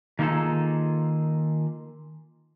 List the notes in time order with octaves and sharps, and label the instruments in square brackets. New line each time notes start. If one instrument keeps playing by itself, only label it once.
[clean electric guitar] D#3 A#3 D#4 F4 G#4 A4